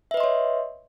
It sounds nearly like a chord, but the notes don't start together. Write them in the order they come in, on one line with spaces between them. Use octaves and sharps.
E5 B4 D#5 C6 C#5